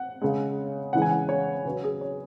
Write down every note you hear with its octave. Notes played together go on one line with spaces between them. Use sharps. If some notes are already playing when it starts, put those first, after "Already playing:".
Already playing: F#5
C#3 G#3
C#3 E3 G#3 F#5
G#5
F#5
C#5
C#3 F#3 B4
G#4
C#5